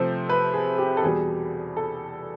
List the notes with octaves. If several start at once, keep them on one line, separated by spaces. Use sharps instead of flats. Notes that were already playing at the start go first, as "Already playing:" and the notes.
Already playing: C3 F3 A3 C5
B4
G#4
G4
A4
E2 B2 G3 G#4
A4